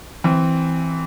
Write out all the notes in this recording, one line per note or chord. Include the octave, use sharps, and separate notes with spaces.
E3 C4